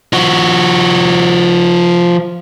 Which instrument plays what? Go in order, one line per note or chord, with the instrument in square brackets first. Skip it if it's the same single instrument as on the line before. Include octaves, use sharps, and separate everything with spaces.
[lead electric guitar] F3 F#4